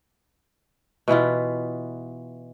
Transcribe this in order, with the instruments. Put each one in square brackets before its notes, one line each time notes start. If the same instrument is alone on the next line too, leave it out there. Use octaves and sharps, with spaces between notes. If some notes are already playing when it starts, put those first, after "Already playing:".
[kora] B2 E3 E4 F4